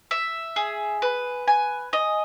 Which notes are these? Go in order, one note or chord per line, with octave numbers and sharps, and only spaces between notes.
E5
G#4
B4
G#5
D#5